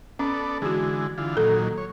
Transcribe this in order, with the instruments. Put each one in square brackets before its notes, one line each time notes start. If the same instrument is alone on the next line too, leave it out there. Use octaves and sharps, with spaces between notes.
[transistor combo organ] B3 A4 D5 [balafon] C#4
[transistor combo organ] D3 E3 G#3 [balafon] F#4 G#4
[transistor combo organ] D3 E3 F4
[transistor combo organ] A#2 D#3 F#3 [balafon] A4
[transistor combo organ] C#5